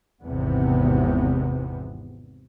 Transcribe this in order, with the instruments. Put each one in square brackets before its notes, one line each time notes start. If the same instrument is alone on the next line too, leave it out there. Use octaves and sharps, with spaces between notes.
[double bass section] G#1 E2 C3 B3